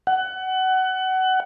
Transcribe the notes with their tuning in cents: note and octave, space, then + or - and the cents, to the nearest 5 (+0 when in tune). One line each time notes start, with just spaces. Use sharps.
F#5 +25